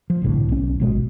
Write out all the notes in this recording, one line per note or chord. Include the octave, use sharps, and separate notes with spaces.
F3
G1 C2 A2 D3
B1 C#4
G#1 B2 G#3